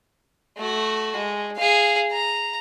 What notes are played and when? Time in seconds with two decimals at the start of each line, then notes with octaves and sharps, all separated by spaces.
0.57 A3 F#4
1.16 G#3
1.57 G#4 F5
2.12 A#5